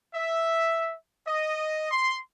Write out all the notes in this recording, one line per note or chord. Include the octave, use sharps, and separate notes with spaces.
E5
D#5
C6